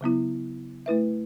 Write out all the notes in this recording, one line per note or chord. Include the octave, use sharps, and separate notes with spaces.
C#3 F#3 B3 E4
A3 E4 B4 E5